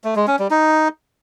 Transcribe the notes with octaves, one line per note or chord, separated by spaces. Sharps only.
A3
G#3
C#4
G3
D#4